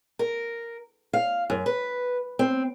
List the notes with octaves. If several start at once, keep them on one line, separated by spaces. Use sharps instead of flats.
A#4
F5
F#2
B4
C4